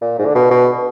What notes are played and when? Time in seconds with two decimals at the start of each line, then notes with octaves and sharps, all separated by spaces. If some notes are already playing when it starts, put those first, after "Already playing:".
0.02 A#2
0.19 G#2
0.26 D3
0.35 B2
0.50 B2